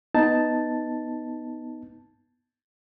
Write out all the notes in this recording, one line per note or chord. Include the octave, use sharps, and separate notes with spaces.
B3 D#4 A5